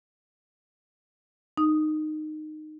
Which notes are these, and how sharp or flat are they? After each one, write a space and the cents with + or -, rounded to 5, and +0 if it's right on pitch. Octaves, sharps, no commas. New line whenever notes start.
D#4 -15 D#6 +0